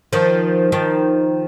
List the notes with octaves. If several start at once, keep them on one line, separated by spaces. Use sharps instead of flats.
D#3 F3
D#3 F3